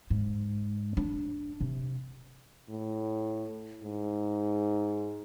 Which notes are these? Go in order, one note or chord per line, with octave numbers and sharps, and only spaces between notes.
G#2
D4
C3
A2
G#2